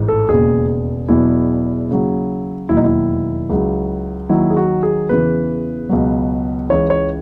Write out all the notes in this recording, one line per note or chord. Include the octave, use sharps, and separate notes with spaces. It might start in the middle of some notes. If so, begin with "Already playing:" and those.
Already playing: A1 G#2 E3
A4
E1 D#2 C#3 G#4
E1 E2 B2 F#3 E4
D#2 C#3 F#3
E1 D#2 D#3 F#3 E4
D#4
E4
C#2 C#3 F#3
D#2 D#3 F#3 E4
G#4
F#4
G#4
E2 C#3 E3 B4
C#2 B2 F#3
C#2 C#3 E3 C#5
C#5